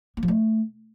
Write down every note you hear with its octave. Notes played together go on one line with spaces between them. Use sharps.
A#3
F3
A3